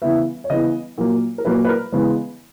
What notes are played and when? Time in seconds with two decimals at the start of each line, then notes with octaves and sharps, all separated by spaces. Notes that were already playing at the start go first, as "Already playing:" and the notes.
0.02 C#3 E3 B3 E5
0.44 C#5
0.50 C#3 E3 B3 D#5
0.98 A#2 F#3 A#3
1.38 A#4
1.45 A#2 F#3 A#3 B4
1.65 B4
1.69 A#4
1.92 C#3 E3 G#3 B3